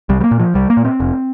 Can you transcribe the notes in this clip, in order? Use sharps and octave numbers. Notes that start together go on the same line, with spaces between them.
C2 G3
G3
A#3
A#2
F3
C2 G3
A#3
A#2
C4
F1